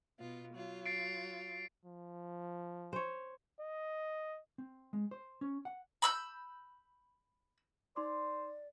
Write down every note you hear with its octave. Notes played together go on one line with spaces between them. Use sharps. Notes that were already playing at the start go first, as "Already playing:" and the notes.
B2 B3 F4
F#3 F4
A6 C7 D7
F3
C5 C#5
D#5
C4
G#3
C5
C#4
F#5
B5 E6 F#6 G6
D#4 C5 D5 C6 D6